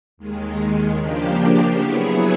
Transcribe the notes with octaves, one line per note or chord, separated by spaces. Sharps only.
D#2 D#3 G#3
C#3 F3 A#3 D4 G4
F#3 B3 E4 G#4 C#5